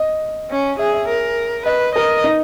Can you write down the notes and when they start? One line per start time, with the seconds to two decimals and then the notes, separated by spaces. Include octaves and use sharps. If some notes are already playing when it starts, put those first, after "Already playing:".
Already playing: D#5
0.50 C#4
0.79 G#4 E5
0.93 E5
1.08 A#4
1.66 B4 D#5
1.95 A#4 D#5
2.24 D#4